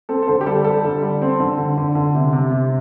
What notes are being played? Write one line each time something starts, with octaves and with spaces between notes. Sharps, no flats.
C4 A4
A4
D3 C5
G4
G3 A4
G3 A4
D3
G3
C4
D3
D3
D3
D3
C3
C3
C3